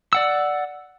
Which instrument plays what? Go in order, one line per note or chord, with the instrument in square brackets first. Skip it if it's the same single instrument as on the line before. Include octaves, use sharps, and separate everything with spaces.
[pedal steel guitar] D5 F#5 E6